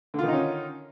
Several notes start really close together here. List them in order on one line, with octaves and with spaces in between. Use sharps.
D3 F4 D#3 D#4 C#4